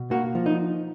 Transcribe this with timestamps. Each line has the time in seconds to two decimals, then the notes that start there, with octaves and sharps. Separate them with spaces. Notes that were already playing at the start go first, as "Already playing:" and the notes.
Already playing: B2
0.11 A#3 F#4
0.35 F3
0.46 D#4